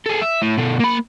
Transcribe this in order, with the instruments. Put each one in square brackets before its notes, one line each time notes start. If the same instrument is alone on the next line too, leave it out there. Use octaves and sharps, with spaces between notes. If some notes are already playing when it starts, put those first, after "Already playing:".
[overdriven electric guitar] G#4 A4
E5
A2
B2 A3
A#3 B5